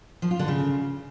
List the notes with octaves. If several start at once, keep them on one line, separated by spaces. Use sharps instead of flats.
F3
F4
D3
C#3